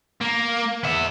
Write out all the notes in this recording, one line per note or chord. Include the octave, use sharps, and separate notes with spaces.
A#3
B3 E5